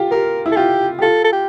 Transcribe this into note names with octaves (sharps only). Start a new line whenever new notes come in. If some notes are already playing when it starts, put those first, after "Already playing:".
Already playing: F4 G4
G4 A#4
E4
A4
F4 G4
G4
F4 A4
A4
G4